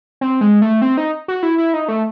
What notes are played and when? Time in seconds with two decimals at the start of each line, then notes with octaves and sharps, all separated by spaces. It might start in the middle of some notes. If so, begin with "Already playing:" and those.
0.21 C4
0.41 G#3
0.62 A3
0.82 C4
0.97 D#4
1.28 F#4
1.43 E4
1.58 E4
1.74 D#4
1.88 A3